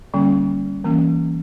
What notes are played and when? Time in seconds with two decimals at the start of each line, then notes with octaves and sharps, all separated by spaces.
0.14 D3 G3 A#3 C#4
0.84 E3 A#3 C#4